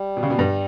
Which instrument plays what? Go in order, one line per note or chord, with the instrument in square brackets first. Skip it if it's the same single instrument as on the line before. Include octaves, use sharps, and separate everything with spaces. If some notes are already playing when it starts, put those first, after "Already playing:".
Already playing: [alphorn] G3
[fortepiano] B2
C#3
B2
G2